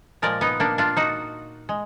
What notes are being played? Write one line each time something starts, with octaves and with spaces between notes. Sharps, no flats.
A#2 F3 G#3 A#4 D5
B3 D#4
A#3 D4
D4 F4
D#4 F#4
G#3